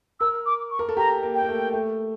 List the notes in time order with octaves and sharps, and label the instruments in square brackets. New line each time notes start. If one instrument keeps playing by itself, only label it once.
[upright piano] A#4 [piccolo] E6
[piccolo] D6
C#6
[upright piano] A#4
A4
[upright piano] G4 [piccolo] A#5
[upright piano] A#3
[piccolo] G5
[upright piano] A#3
A3
A3